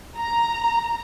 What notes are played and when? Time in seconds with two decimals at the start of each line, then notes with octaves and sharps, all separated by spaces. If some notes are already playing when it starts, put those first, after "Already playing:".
0.19 A#5